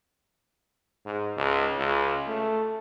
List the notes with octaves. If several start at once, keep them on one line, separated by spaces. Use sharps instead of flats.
G#2
C#2
C#2
A3